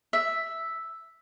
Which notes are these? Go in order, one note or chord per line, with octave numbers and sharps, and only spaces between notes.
E5